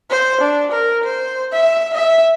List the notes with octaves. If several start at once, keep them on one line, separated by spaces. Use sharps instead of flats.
C5
D4
A#4
C5
E5
E5